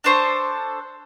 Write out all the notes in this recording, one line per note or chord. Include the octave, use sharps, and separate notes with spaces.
D4 A4 C5 C#6